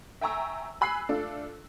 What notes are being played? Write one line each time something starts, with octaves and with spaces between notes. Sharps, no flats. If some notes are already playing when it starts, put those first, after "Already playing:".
E5 G5 G#5 A#5 C#6 E6
G#5 B5 E6 F#6 C7
A3 D4 F4 A4